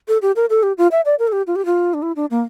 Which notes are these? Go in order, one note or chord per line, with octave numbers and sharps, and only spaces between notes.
A4
G4
A#4
A4
G4
F4
E5
D5
A#4
A4
G4
F4
G4
F4
D4
E4
D4
A#3